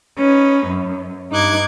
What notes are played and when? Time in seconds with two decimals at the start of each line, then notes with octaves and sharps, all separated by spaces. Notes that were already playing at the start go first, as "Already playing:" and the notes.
0.18 C#4 D#4 B4
0.66 F#2
1.31 G2 D#4 D6 F#6 G#6